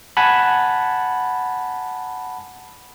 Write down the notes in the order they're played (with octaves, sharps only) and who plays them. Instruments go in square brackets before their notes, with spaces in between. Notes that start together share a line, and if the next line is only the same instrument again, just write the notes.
[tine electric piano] F#5 G#5 A5 B5